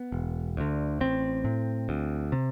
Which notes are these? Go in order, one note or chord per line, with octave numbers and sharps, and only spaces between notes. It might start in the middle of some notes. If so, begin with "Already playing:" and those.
Already playing: B3
E1
D2 D3
A1 C4
A2
D2
C3